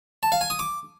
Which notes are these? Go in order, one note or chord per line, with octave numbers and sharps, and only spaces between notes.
A5
F5
G#5
D#6
D6